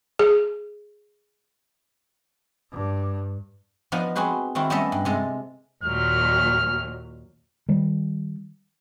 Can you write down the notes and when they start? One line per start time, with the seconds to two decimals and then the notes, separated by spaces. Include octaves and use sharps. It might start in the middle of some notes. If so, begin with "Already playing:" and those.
0.19 G#4
2.72 G2
3.92 F3 B3 D4 D#4 A#4 B4
4.15 C4 F#4 G#4 B4 C5
4.55 D#3 C4 E4 F#4
4.70 G3 A3 B3 C#4 D#5 E5
4.92 G2
5.05 C3 G#3 A4
5.84 D#2 A#2 F#3 F6
7.69 D#3 G3